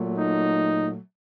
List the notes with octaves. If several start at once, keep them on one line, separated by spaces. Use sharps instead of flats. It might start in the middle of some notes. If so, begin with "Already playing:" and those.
Already playing: A#2 F#3 A3
D#4